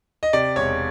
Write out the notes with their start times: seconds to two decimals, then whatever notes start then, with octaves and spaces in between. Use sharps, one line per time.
0.23 D#5
0.33 C3 D5
0.56 E1 C#5